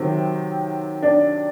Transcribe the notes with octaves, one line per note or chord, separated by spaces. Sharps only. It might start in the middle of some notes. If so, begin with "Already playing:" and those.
Already playing: C3 D#3 F#3 C4
D4